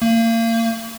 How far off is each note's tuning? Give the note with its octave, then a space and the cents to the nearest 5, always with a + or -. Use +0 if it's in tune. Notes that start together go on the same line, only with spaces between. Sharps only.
A#3 -35